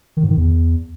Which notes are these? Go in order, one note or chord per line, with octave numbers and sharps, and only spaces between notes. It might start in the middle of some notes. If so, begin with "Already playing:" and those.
D#3
G#2
D#3
E2